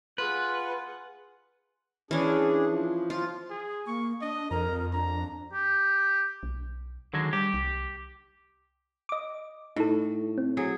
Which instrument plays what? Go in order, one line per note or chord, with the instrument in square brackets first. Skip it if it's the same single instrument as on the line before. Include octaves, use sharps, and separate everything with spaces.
[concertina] F4 [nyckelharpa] G#4 F#5 [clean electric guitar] B4
[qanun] E3 C#4 [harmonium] D4 G#4
[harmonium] F3
[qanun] F4
[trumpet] G#4
[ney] A#3 [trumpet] C#6
[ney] D4 [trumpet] D#5
[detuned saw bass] F2 [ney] A#4 [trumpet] A#5
[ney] D4 [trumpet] A#5
[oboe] G4
[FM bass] B1
[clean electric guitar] D3 F#3 G#3 [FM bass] D#3
[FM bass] G3 [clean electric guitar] G4
[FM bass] C2
[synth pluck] D#5 D6
[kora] A2 [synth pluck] D#4 A4
[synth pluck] C4
[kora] F#3 G#4